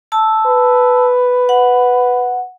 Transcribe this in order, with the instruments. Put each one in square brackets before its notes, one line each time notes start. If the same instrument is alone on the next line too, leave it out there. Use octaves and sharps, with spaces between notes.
[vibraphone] A5 E6
[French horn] B4
[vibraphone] F#5